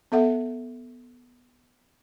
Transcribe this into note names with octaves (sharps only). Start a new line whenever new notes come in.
B3 A4 E5 F#5